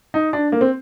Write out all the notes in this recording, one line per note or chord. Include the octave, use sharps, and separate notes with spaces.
D#4
D4
A#3
C4